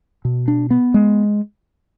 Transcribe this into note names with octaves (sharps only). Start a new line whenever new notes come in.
B2
D4
B3
G#3